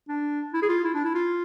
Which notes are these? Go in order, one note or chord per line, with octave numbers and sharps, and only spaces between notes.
D4
E4
G#4
F4
E4
D4
E4
F4